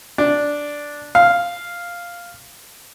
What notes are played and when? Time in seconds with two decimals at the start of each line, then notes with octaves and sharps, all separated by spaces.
0.18 D4
1.15 F5